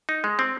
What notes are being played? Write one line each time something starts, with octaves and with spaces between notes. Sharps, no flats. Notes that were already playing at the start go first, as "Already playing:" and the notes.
D#4
G#3
C4